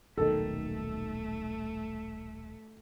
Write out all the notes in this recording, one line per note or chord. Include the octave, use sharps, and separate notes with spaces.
D#1 B1 D#3 A3 A4